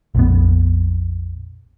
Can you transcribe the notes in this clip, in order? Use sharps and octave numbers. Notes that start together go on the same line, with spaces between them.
A#1 F2 B3